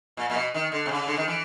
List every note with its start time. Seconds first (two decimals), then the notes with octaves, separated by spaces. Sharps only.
0.17 A#2
0.30 A#2
0.35 B2
0.54 D#3
0.72 D3
0.86 C3
0.91 C#3
1.07 D3
1.17 D#3
1.28 E3